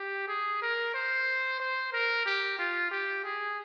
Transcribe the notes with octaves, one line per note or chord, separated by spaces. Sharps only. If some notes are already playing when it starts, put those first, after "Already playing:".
Already playing: G4
G#4
A#4
C5
C5
A#4
G4
F4
G4
G#4